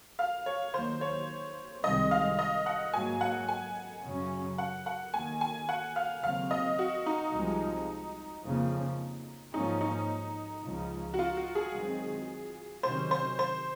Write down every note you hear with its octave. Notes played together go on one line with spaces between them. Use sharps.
F5
C#5
D#2 D#3 F#3 A#3 C5
C#5
C2 C3 D#3 G#3 C4 D#5
F5
D#5
F#5
G#2 F#3 A#3 G#5
F#5
G#5
F#2 C#3 F#3 C#4
F#5
F#5
D#2 D#3 A#3 G#5
G#5
F#5
F5
D#2 C#3 F#3 C4 F5
D#5
F#4
D#4
C2 C3 F3 G#3
F2 C#3 F3 A#3
G#2 F3 A#3 C#4 D#4
D#4
C#2 C#3 F3
F#4
F4
F#4
G#4
F#2 D#3 G#3 C4
C3 D#3 F#3 C#4 C5
C5
C5